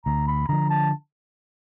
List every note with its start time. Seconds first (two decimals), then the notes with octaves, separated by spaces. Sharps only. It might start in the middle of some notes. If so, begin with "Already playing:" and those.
0.05 D2 A#5
0.27 B5
0.48 D3 F3 A#5
0.70 A5